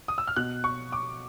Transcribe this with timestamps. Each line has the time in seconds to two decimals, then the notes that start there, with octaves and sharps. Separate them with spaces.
0.08 D#6
0.18 E6
0.27 F6
0.36 B2 F#6
0.64 C#6
0.92 D6